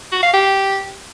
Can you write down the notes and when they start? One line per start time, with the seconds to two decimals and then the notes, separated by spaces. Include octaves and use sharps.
0.12 F#4
0.22 F5
0.33 G4